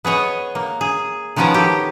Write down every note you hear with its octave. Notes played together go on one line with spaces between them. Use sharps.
B3 G#4 C#5 D#5
A#3
G#4
D#3 F3 B3 C#4 A#4 A5
G4 A4